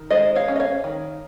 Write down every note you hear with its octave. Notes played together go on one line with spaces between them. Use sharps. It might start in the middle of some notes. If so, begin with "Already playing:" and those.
Already playing: D#3
G#3 C5 D#5
C#5 F5
C#4
D#5
C#5 F5
D#3